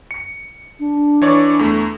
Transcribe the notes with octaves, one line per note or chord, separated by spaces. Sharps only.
C#7
D4
E3 C#5 D5
E2 A3